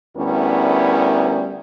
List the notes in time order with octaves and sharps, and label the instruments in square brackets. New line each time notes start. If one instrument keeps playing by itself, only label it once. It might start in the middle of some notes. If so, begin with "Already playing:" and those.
[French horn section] D2 G3 B3 C#4 E4 A#4